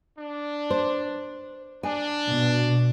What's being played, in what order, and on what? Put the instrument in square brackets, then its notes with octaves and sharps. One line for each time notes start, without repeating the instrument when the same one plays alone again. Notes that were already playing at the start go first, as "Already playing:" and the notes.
[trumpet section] D4
[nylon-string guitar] C5
[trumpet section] D4 [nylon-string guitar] G#5
[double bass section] B2